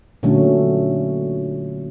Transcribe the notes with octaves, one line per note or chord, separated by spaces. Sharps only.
A#2 D3 F#3 A3 C#4